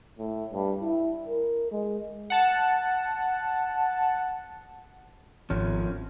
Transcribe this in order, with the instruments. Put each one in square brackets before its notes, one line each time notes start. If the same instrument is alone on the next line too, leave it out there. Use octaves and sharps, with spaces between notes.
[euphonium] A2
G2
E4
A#4
G#3
[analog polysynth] F#5 A5
[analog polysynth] G#1 [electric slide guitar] F3 C#4